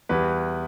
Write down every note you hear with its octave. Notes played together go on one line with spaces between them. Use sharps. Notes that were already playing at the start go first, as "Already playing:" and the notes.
E2 E3 G3 B4